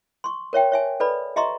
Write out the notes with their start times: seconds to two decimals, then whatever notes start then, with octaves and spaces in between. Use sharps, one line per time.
0.24 C6 C#6
0.53 A#4 C#5 E5 G5
0.72 C#5 E5 G#5
1.00 A4 B4 D5 B5
1.36 G4 D#5 E5 A#5 C6 C#6